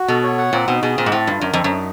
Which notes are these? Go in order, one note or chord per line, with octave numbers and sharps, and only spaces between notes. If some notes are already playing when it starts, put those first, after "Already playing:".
Already playing: F#4
B2 A4
C#5
F#5
A#2 C4
B2 D#4
B2 G#4
A#2 C4
G#2
A2 C4
G2 F4
F#2 A#4
F2 C4
F#2
D#4